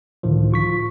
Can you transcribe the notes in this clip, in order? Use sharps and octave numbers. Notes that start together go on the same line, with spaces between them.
C#2 A2 D3 D#3 F3
F4 C#6 B6